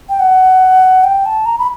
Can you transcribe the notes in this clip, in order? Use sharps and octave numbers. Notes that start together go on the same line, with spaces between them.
G5
F#5
G5
A5
A#5
B5